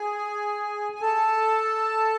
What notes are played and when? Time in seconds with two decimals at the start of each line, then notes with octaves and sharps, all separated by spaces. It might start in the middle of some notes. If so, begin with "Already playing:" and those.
Already playing: G#4 G#5
0.95 G#5
1.01 A4 A5